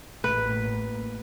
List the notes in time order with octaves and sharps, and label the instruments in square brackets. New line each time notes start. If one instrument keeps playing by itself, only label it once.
[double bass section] A1 A#3 [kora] B4